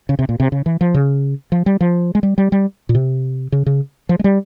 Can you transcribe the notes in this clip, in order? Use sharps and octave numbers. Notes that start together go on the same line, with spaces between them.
C#3
C3
A#2
C3
C#3
E3
F3
C#3
F3
G3
F3
G#3
G3
G3
G3
A#2
C3
C#3
C#3
F3
G#3
G3